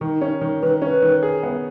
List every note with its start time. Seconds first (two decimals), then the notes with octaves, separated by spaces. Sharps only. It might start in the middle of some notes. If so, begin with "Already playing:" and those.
0.01 D#3 D#4
0.21 C#4
0.41 D#3
0.62 D#3 B4
0.82 C#4 B4
1.02 D#3
1.23 G#4
1.43 B3